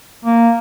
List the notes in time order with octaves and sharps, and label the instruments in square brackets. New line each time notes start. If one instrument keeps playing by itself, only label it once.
[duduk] A#3